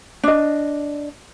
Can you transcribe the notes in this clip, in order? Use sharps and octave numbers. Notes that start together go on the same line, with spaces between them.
D4 D#5